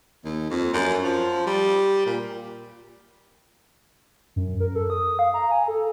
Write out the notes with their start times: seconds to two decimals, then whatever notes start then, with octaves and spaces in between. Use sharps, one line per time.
0.25 D#2
0.50 F2
0.73 F#2
1.04 F3
1.47 G3
2.06 A#2
4.36 F#2
4.60 A#4
4.75 A4
4.90 D#6
5.19 F5
5.34 A#5
5.51 G#5
5.68 A4